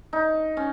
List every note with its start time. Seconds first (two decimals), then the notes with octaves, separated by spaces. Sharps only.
0.13 D#4
0.57 C#4